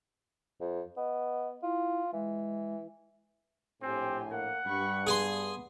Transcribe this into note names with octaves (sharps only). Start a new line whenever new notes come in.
F2
B3 D#5
E4 F4
E3 G#3
A#1 A2 C4 G4 G#5
A#3 F#5
G2 B5 C#6
B3 G#4 G#5 C6